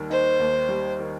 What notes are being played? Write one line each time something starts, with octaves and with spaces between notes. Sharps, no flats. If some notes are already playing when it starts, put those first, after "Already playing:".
Already playing: D#2 D#3 G3
D#4 C5
D#2
G3
D#3